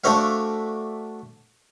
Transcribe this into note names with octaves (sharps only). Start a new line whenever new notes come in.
A3 D4 F#4 C5 E5 F5